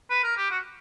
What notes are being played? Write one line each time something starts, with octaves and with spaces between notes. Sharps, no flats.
B4
A#4
G4
F#4